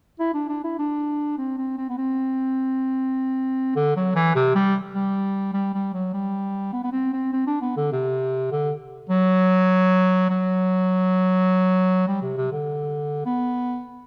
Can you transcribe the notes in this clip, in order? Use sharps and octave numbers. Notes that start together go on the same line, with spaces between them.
E4
D4
D4
E4
D4
C4
C4
C4
B3
C4
D3
F#3
E3
C3
G3
G3
G3
G3
F#3
G3
B3
B3
C4
C4
C4
D4
B3
D3
C3
D3
F#3
F#3
G3
C3
C3
D3
B3